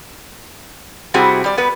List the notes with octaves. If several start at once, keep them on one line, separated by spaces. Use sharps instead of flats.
C3 G3 C4 E4 F#4 G#4
G3 D5
B3 B4